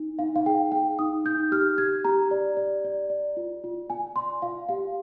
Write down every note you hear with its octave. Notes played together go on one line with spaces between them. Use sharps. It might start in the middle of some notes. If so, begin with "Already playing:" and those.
Already playing: D#4
D#4 F5
F5
G#4 G5
G#4 G5
D#4 D#6
D#4 G6
G4 F6
G4 G#6
G4 A#5
D5
D5
D5
D5
F4
F4
F4 G#5
D5 C6
F4 F5
G4 F5